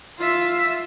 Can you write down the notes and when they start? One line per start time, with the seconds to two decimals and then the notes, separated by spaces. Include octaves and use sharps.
0.18 F4 E5